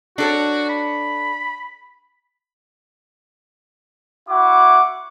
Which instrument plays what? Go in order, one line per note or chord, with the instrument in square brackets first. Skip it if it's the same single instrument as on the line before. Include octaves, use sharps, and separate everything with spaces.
[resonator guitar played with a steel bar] D4 A4 C#5 [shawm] F#4
[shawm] B5
[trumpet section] E4 F#4 F#5 D6